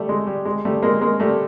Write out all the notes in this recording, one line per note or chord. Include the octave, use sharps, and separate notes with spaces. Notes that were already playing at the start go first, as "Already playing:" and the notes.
Already playing: G3 A3
G#3
G3
G#3
G3 A3
G#3 A#3
G#3 A#3
G3 A3